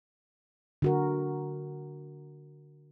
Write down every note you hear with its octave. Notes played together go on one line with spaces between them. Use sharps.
D3 F#4 A#4